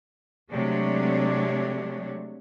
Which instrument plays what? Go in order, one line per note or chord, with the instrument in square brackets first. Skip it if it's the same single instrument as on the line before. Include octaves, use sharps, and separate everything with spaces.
[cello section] C3 F#3 G#3 A3 D4 C#5